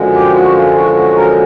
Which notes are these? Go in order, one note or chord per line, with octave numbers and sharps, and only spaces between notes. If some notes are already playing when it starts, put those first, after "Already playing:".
Already playing: F#2 D3 F3 G#3
G4
F#4
F4
F#4
F#4
A#4